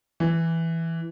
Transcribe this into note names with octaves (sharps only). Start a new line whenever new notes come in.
E3